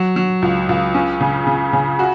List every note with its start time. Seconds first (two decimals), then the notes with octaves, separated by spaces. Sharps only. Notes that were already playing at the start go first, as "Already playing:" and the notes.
Already playing: F#3
0.16 F#3
0.42 C#2
0.69 C#2
0.94 C#4
1.21 C#3
1.47 C#3
1.73 C#3
1.99 F#4